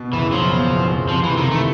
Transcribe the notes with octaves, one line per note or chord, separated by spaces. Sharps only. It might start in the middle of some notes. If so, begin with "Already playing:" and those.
Already playing: B2
F#1 E3
F3 F#3
E2
B2
F#1
C3 F3
F1 E3
D#3
E3 A3